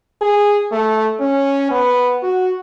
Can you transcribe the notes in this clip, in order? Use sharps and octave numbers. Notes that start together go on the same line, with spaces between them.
G#4
A3
C#4
B3
F#4